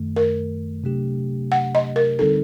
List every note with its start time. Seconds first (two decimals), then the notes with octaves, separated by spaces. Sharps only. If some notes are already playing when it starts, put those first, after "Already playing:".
Already playing: F#2 D#3 A3
0.16 A#4
0.84 C3 F#3 A3 D4 G4
1.52 F#5
1.75 D#5
1.96 A#4
2.19 D3 G3 C4 D#4 A4